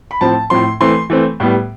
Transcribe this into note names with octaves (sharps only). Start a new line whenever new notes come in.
B5
A2 F3 C4 A5
A2 F3 C4 C6
E3 A3 C4 C6
E3 A3 C4
A2 G3 B3